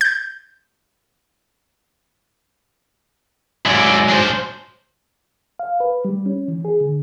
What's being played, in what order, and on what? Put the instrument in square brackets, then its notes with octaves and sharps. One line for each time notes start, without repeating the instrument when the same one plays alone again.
[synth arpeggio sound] G6
[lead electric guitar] G#2 F#3 [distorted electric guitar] E4 D5
[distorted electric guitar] D4 C5
[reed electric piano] F5
B4
G3
C#4
E3
G#4
D3